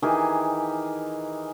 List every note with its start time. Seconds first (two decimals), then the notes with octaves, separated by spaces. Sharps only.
0.02 D#3 E3 G4 G#4